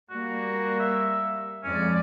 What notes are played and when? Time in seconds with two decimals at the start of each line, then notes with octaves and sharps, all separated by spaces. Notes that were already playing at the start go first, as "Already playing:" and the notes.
0.10 G3 A#3 F#4
0.80 E5
1.63 F2 G#3 C#4 D5